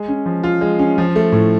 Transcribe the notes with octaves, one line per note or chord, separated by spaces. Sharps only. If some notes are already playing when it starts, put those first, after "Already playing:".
Already playing: G#3
C#4
F3
F4
G#3
C#4
F3
A3
A2